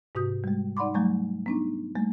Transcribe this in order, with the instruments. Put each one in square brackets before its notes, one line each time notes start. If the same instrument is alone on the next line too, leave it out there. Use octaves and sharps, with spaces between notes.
[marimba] G#2 C3 F#4 D#6 G6
G3 G#3
D#4 D5 F#5 B5 C6 D6
F#3 G3 A3 A#5 C#6
B3 D4 D#4
G3 A3 A#3